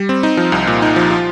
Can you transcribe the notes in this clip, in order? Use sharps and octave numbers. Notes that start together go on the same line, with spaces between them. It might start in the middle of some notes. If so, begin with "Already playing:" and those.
Already playing: G3
C4
D#4
F3
C2
A#2
D#4
F3
F4